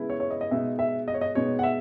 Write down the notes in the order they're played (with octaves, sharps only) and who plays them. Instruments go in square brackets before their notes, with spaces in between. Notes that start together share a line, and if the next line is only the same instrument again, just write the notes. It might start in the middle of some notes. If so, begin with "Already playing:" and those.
Already playing: [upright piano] C#3 G#3 B3 E4
[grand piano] C#5
C#5
D#5
D#5
[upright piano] B2 G#3 D#4 [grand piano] E5
[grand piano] E5
D#5
C#5
D#5
[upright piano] B2 G#3 D#4 [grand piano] C#5
[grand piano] F#5
E5